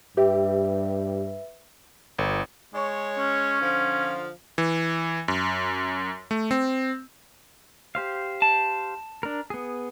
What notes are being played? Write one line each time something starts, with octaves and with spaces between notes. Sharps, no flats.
G2 G4 B4 E5
G1
G#3 C#5
C#4
D3 F3 F4
E3
F#2
A3
C4
G4 C5 F5
A5
D4 A#4
B3 G#4